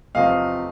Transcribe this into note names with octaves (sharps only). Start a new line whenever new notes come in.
E2 C3 F3 A3 C4 D#5 F5